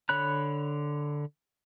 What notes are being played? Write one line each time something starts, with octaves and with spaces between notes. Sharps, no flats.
D3 C#5 B5 F#6